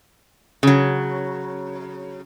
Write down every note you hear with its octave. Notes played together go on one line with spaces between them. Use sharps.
C#3 F#3